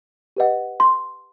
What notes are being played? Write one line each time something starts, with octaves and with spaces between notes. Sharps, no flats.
G4 B4 D#5 F#5
C6